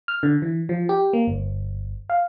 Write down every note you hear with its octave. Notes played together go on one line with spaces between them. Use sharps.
F6
D3
E3
F3
G4
A#3
G1
F5